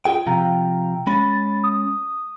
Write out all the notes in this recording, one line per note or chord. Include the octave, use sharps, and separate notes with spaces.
F4 G#4 G5
C3 F3 F5 G5 A#5
G#3 C#4 B5 A6
D#6